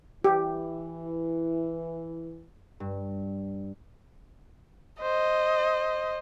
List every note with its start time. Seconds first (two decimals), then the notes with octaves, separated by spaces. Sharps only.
0.24 E3 E4 G4
2.80 G2
5.02 C5 D#5